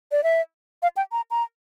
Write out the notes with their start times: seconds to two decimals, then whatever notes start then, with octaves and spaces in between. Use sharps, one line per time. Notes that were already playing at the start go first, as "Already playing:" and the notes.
0.12 D5
0.23 E5
0.83 F5
0.97 G5
1.12 A#5
1.31 A#5